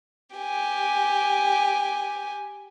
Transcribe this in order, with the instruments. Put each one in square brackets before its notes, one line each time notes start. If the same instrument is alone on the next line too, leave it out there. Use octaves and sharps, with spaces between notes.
[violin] G4 G#5